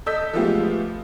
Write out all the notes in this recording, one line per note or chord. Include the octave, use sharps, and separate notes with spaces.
A4 D#5 E6 G6 B6
F3 G#3 A3 B3 F4 G4